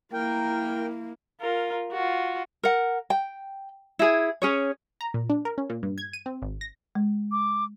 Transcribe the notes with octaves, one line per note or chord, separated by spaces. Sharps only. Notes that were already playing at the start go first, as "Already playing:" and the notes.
A#3 E4 A#4 G5
F4 A#4
F4 F#4
A#4 F#5
G5
E4 G#4
C#4 G#4 C#5
A#5
A#2
D4
A#4
C#4
A#2
G2
G#6
D#7
C4
G#1
A#6
G#3
D6